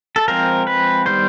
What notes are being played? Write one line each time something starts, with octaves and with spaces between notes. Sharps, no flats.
A4
F3 G#3 C4 A#4
B4
D#3 G3 B3 C5